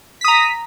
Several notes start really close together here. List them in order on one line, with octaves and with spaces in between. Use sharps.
B6 D#6 A#5